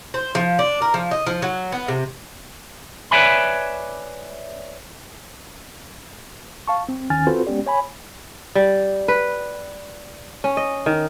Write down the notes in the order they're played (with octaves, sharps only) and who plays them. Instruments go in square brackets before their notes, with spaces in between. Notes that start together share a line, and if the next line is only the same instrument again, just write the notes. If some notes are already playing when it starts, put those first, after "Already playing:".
[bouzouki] C5
F3
D4
A#4
F3
D#5
F3
F#3
B3
C3
[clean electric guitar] B4 C#5 D5 E5 G#5 B5
[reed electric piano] F5 A5 C#6
C4
D#2 D#3 C#4 G#5 F6 A6
C4 F4 F#4 A4 B4 C5
G#3 B3 C#4 G4 D5
C#5 G#5 B5
[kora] G3
B4
C#4
D#5
D#3